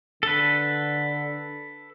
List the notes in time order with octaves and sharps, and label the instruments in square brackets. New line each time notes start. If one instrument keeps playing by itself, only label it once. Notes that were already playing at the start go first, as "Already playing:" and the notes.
[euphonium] D3 [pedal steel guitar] A4 B4